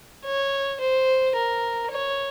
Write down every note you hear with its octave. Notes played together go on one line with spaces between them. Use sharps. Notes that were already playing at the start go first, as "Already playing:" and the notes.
C#5
C5
A#4
C#5